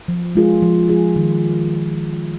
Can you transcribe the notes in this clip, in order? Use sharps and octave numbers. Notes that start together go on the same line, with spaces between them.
F3
G#3 F4 G#4
F3
G#3 F4 G#4
D#3